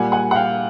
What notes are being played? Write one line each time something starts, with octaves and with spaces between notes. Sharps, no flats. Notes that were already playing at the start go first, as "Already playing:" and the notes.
Already playing: A#2 G3 F#5 G#5
F#5 G#5
F#5
F5 G5